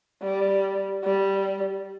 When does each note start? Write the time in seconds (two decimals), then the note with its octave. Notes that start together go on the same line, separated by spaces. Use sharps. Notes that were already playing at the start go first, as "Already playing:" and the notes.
0.23 G3
1.04 G3